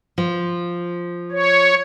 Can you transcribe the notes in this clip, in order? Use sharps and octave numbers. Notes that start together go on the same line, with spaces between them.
F3
C#5